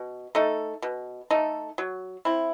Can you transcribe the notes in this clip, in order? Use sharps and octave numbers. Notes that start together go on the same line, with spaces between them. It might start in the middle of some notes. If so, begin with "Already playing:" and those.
Already playing: B2
A3 D#4 A4
B2
A3 D#4 A4
F#3
C4 E4